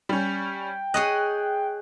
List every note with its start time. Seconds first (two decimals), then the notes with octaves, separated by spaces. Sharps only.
0.09 G3 C#4 G5
0.94 G#4 C#5 D#5 F#6